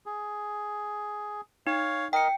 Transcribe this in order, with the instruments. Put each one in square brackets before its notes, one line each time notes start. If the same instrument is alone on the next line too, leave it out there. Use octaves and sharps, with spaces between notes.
[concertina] G#4
[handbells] D#4 [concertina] C#5 F5
[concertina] A#4 D#5 [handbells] G5 C#7